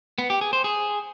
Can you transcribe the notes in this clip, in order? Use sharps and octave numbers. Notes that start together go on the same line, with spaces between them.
B3
G4
G#4
C5
G#4